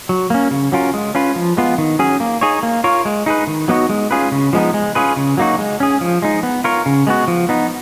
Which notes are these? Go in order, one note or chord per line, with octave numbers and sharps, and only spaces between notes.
F#3
A#3 C#4
C#3
F#3 C#4 F4 A#4
G#3
C#4 F4 B4
F3
G#3 B3 F4
D#3
F#3 C#4 G#4
A#3
D#4 G#4 C#5
A#3
F4 A#4 C#5
G#3
D#4 G#4 B4
D#3
F#3 B3 D#4 F#4
G#3
C#4 F4 G#4 B4
C#3
F3 G#3 B3 D#4
G#3
C#4 F4 G#4 B4
C#3
F#3 A#3 D#4 F#4
G#3
C#4 G#4
F3
G#3 D#4
B3
F4 A#4 C#5
C#3
G#3 B3 F#4
F3
B3 D#4